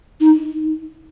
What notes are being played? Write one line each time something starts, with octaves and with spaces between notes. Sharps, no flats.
D#4